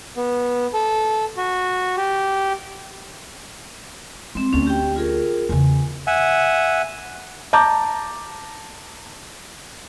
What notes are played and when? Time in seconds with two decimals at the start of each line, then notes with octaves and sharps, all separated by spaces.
0.17 B3
0.74 A4
1.37 F#4
1.97 G4
4.35 G#3 C4 C6
4.53 D2 C#4 D4
4.67 G4 G5
4.96 F4 G#4 A#4
5.49 E2 C#3 G#5
6.07 E5 F#5 G#5
7.53 A5 A#5 D6 G6